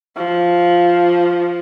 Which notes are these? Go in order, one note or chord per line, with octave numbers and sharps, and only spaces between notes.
F3